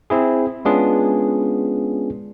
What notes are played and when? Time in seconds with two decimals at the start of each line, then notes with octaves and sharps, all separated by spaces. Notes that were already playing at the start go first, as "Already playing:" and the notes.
0.10 C4 E4 G#4
0.65 G#3 B3 C#4 D4 F4 G#4